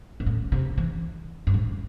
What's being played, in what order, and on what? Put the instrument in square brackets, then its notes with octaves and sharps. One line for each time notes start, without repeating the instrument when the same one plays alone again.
[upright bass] B2
A2
C3
E3
G2
A2